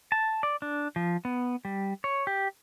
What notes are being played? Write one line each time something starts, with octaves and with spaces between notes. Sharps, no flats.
A5
D5
D4
F3
B3
G3
C#5
G4